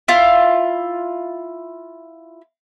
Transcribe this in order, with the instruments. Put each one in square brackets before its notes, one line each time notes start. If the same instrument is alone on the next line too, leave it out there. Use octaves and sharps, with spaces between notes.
[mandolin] E4 F4